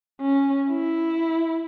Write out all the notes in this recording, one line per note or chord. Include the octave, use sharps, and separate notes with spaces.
C#4
E4